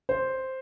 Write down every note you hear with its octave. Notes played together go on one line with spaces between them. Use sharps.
C5